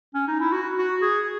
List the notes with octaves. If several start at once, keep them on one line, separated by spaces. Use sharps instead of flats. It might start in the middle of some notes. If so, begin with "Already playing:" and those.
C#4
D#4
E4
F#4
F#4
G#4